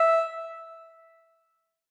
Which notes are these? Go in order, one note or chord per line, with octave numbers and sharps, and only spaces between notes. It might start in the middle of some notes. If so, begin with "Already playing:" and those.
Already playing: E5